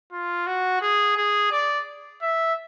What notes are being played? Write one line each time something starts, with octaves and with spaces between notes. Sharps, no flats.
F4
F#4
G#4
G#4
D5
E5